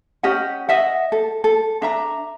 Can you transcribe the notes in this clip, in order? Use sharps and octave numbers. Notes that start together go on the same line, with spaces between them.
C#4 G4 D#5 F#5
D#5 E5 F#5
A4
A4
D4 E5 A#5